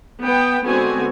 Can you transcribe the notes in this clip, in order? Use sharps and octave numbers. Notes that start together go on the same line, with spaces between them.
B3 G5
D3 G#3 B3 C4 F#4 G#5